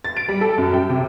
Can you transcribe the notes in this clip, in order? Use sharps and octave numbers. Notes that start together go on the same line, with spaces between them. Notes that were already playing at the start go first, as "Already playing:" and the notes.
A6
D7
G3
A4
F#2
G5
C3